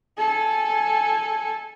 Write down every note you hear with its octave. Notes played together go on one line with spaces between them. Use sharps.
A4 G#5